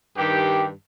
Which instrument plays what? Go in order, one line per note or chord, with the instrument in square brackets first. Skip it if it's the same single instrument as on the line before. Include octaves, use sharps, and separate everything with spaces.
[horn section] G2 D#3 G4